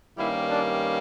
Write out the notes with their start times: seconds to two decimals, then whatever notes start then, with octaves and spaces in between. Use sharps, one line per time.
0.17 G2 D#3 G3 A#3 C#4 E4
0.49 D4